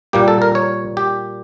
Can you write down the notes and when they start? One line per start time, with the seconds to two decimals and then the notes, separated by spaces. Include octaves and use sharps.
0.13 A#2 G3 A#3 G4
0.28 A4
0.42 A#4
0.55 C#5
0.97 G4